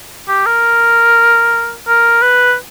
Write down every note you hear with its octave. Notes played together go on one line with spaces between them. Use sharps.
G4
A#4
A#4
B4